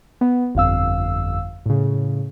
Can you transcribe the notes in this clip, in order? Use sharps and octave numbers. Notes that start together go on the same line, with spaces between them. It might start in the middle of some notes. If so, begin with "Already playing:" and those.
B3
G1 F2 F5 E6
A2 C#3